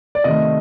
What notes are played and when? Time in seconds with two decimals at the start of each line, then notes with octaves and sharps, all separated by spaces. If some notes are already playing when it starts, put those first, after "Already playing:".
0.15 D5
0.24 C3 D#3 A3 D#5